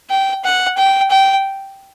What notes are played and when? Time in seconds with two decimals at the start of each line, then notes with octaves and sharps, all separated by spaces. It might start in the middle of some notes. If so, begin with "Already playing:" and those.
0.10 G5
0.44 F#5
0.78 G5
1.11 G5